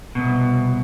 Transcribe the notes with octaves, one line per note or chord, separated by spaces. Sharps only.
C2 B2